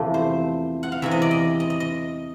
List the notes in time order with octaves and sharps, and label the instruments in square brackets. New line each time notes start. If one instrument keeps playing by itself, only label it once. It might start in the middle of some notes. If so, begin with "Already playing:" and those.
Already playing: [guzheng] E2 C3 F3 A3
C5
F#5
F5
E2 C3 E3 E5
D#5
D5
D#5
D#5
D#5
D#5